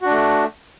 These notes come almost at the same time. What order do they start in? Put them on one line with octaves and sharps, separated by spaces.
F#4 D4 A3